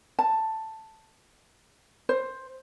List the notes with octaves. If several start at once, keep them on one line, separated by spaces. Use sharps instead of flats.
A5
C5